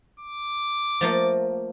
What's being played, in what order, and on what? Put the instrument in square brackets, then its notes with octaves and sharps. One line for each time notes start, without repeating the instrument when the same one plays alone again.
[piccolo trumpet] D6
[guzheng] F3 A3 A#3